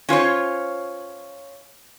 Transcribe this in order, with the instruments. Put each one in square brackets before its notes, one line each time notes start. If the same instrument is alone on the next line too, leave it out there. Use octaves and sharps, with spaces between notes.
[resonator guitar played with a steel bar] C#4 F4 C5 C#5